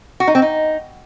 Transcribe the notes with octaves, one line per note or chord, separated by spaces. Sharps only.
F#4
D#4
C4
D#4